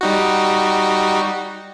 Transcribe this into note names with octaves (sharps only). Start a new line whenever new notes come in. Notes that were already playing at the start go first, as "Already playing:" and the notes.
G3 D#4 F#4